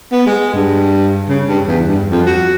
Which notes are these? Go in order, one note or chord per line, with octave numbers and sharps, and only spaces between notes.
B3
G#3
G2
C#3
G2
E2
G2
F2
F#4